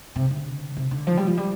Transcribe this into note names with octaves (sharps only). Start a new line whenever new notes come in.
C3
D3
C3
D3
F3
G3
F3
G3